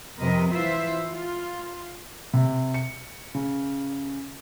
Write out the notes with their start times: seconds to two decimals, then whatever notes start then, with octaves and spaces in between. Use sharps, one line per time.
0.20 F2 C3 A#4 B4 D#5
0.52 E3 E4 F4 B4 C5 E5
1.12 F4
2.34 C3
2.74 C#7
3.35 C#3